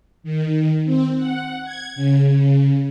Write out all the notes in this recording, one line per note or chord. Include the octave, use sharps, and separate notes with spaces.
D#3
C4
F#5
G#6
C#3